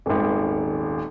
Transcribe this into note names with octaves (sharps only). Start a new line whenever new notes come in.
D#1 G#1